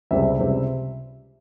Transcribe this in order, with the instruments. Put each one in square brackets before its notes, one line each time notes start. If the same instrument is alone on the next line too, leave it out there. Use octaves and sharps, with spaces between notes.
[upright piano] C#2 C3 G3 C4 E5
C#2 C3 G3 C4